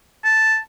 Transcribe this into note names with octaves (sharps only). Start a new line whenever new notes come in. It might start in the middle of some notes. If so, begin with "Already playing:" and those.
A5